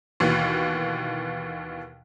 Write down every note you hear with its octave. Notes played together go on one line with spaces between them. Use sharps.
D#2 B2 E3